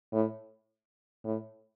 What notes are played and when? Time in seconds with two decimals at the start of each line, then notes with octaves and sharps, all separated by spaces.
0.13 A2
1.25 A2